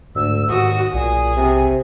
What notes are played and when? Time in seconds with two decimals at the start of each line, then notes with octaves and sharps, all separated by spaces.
0.15 D2 G#2 E6
0.49 D#2 G#2 F#4 D#6
0.94 B1 A#2 G#4
1.36 C3